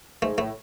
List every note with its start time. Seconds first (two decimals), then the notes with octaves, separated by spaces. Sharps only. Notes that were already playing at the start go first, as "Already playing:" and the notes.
0.22 G#2 A3
0.38 A2 A3